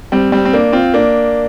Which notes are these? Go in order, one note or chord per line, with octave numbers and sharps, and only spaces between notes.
G3 C4
G3 C4
C4
A#3 D4
C4 F4
A#3 D4